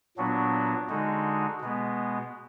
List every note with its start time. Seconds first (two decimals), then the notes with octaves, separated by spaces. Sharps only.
0.17 A#2 F#3 B3 D4 F#4
0.89 D3 G#3 D#4 F#4
1.61 B2 G#3 B3